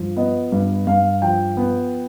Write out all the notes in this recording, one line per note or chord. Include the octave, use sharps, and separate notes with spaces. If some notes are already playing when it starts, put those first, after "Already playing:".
Already playing: G2 F3
B3 D#5
G2
G2 F5
F3 G5
B3